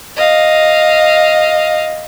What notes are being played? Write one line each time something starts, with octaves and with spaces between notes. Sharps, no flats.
D#5 F5